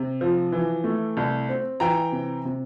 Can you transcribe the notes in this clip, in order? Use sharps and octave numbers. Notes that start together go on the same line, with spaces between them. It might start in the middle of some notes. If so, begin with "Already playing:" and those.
Already playing: C3
F3
E3
A3
C2
C4
E3 G5 A#5
C3
C3